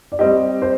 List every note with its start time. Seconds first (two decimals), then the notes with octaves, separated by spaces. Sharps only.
0.12 D5
0.19 G3 C4 G4 D#5
0.62 C5